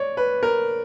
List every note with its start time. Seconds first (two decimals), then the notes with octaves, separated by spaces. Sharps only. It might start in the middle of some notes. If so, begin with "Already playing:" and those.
Already playing: C#5 D5
0.17 B4
0.43 A#4